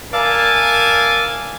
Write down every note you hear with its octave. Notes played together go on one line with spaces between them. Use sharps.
A#4 D5 E5 F5 G#5 A5